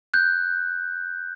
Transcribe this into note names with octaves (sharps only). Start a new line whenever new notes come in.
F#6 G6